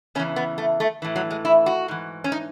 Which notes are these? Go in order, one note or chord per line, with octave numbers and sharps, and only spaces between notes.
E2 C#3 E3 C#4
B3
A3
A3
A2 E3
F#3
G#3
E4
F#4
G#2 E3
C#4
D#4